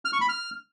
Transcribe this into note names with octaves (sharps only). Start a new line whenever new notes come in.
F6
C#6
B5
F6